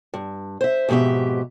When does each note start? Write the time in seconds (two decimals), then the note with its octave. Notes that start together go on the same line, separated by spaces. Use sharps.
0.14 G2
0.61 C5 E5
0.89 F2 G#2 B2 G4 E5